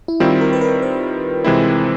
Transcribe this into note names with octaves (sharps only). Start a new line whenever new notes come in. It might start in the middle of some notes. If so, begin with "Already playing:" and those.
E4
D#3 G3 C4 E4 F4
A#4
B4
A#4
C5
C3 E3 G#3 C4 E4